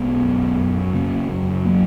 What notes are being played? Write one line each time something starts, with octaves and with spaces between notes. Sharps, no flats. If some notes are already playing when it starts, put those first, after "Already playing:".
Already playing: B1 G#3 B3
F#2
F#2
C#3 A#3 C#4
F#2
F#3 A#3